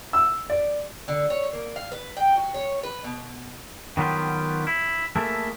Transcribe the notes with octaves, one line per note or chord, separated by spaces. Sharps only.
E6
D5
D3
C#5
A#3
F5
B4
G5
F#4
C#5
B4
B2
D#3 F#3 B3 D#4 F4 G4
E4
A3 A#3 E4 G#4 A4 E5